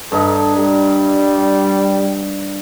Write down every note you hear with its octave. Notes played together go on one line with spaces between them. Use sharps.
G2 D#4 A4
G3